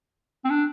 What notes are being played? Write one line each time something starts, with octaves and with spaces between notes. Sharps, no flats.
C4
D4